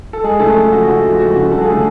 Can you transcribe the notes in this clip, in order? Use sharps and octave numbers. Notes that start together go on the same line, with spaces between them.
A4
G#3 G#4
C#3 A3 A4
F3
F3 F#4
C#3 F#4
F3 F#4
G#3 F#4
C#3
G3 A4
G#4
D3 A3 A4